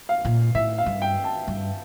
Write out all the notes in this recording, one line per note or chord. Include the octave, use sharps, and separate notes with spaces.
F5
A#2
A2 E5
F5
G2
G5
A5
G2